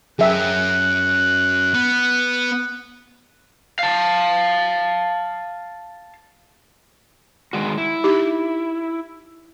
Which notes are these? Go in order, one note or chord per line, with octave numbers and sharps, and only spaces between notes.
F#2 G#4 E5 G5 F#6
B3
F5 A5
D#3 G#3 F#4
E4
D#4 G4